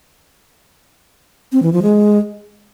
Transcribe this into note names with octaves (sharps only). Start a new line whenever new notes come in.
C4
E3
F3
G#3